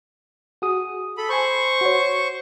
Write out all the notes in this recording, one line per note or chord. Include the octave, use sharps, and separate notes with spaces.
F#4 G#4 D#6
A4 B5
C5 G#5 B5 C#6
F#4 C#5